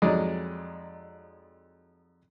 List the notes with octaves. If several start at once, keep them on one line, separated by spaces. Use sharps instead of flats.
F2 F#3 G#3 D#4 D5 D#5